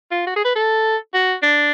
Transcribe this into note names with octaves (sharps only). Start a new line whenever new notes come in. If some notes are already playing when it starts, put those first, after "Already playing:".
F4
F#4
G#4
B4
A4
F#4
D4